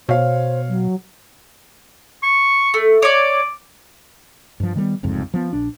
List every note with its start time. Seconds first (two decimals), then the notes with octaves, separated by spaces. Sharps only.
0.09 B2 C5 C#5 F5
0.68 F#3
2.23 C#6
2.74 A3
3.02 C#5 D5 D6
4.60 G2 F3
4.75 D#3 G3 G#3 B3
5.03 F#1 C2 F2 G#2
5.34 F3 B3
5.53 A#1 D4